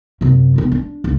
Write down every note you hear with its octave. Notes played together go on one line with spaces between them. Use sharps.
F#2 C3
F1 B3
D4
C#2